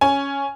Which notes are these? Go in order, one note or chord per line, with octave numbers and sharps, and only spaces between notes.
C#4 G#5